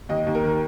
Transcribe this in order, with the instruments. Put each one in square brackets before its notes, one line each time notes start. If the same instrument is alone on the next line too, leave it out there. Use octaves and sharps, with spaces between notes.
[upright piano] D#2 D#5
D#2
A#4
D#3